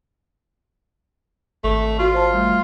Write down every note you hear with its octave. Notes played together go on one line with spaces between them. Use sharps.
G#1 A3 C#6
F4 F#4
C5 A5
G3 A3